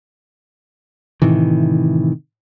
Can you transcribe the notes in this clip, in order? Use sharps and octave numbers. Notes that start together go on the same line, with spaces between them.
A2 C3 D#3 E3